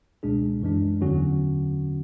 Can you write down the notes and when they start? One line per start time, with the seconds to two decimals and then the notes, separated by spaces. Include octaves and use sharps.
0.23 C#2 B2 G#3 D4 G#4
0.62 F#2 E3 G#3 D4
1.01 E2 D3 F#3 C#4 F#4